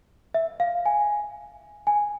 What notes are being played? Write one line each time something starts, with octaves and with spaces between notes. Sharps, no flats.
E5
F5
G#5
G#5